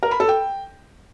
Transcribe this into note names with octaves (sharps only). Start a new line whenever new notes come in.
A#4
B5
A4
G5